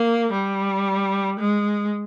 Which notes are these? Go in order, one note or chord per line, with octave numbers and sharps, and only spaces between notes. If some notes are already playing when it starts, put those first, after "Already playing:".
Already playing: A#3
G3
G#3